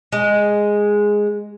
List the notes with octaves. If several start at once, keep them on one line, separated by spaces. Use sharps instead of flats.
G#3